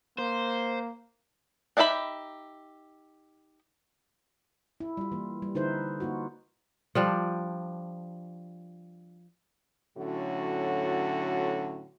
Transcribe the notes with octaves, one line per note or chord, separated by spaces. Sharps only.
A#3 C5
D4 D#4 G4 E5 B5
E4
G3 F4
E3 A#3
G3
D3 D#4 E4 B4 C5
A#3 D#4 F4 F#4
F3 G3 D4
A2 D3 F#3 C#4 F#4